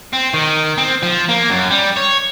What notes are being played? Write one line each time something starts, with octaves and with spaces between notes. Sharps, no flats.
C4
D#3
C4
F3
A#3
F#2
G3
C#5